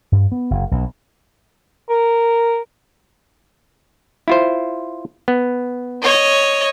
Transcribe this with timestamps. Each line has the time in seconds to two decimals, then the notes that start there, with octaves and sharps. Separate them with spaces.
0.12 G2
0.32 B3
0.51 F#1
0.71 B1
1.90 A#4
4.28 E4 F4 C5
5.28 B3
6.03 C#5 D#5